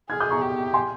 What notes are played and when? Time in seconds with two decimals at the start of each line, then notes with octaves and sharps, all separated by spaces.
0.10 G#4 F6 G#6
0.20 D#6 G6
0.31 A#5 C#6
0.42 G4
0.74 G#5 C6